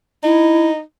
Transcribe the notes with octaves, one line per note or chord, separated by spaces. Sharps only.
D#4 E4